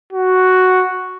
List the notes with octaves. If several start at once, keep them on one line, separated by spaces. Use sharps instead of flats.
F#4